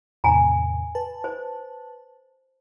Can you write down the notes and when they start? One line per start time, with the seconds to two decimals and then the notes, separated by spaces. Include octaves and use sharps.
0.24 E2 A2 C3 G#5 A#5
0.95 B4 A5
1.24 C5